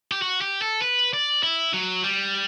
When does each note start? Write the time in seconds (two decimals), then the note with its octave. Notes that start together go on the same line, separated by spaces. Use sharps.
0.12 G4
0.22 F#4
0.41 G4
0.62 A4
0.82 B4
1.14 D5
1.43 E4
1.73 F#3
2.04 G3